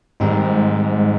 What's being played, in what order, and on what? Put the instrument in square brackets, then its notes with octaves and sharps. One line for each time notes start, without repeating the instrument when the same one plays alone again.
[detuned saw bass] G#2 [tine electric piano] D#3 G3 C4 D#4